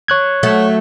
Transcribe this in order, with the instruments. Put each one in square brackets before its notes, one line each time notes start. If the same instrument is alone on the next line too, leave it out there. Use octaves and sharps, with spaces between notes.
[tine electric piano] C#5 F#6 G#6
[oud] F#3 A3